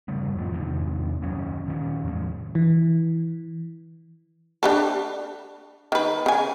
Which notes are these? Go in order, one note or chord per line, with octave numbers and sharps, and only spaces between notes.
G1 C#3 G3 A3
F2 A2 F3
E2 G#2 C3 D#3
F#1 D#2 F#3 C#4
D#1 D#3 C#4
E2 A2 F3 G#3
E3
D4 G4 A4
D#3 B4
C#3 G#5